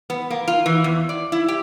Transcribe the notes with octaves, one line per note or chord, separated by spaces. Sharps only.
B3
A#3
F4
E3
E2
D5
E4
G4